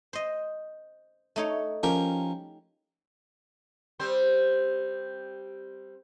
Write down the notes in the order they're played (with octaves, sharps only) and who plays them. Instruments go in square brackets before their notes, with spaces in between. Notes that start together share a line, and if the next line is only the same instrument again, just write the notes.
[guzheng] C5 D#5
A3 D#4 C#5
[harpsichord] F3 C#4 A#4 [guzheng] G4
[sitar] G3 C4 C5